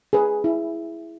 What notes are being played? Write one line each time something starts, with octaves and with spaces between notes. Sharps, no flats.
G#4 B4
E4